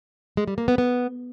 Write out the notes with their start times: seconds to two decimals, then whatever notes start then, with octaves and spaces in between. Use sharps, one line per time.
0.37 G#3
0.48 G3
0.58 A#3
0.68 B3
0.78 B3